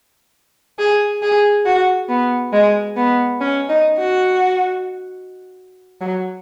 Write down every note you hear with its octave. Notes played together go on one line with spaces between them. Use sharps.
G#4
G#4
F#4
B3
G#3
B3
C#4
D#4
F#4
F#3